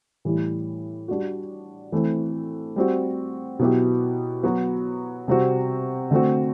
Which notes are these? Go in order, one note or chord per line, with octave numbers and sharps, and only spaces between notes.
A2 E3 G3
G3 D4 F#4
E3 A3 C4
G3 C4 F#4
B2 F#3 B3 E4 G4
F#3 B3 F#4
C3 G3 C4 F#4
D3 A3 C4 F#4